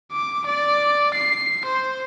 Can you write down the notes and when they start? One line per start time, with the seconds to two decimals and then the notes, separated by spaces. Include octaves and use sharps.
0.12 D6
0.46 D5
1.14 C7
1.65 C5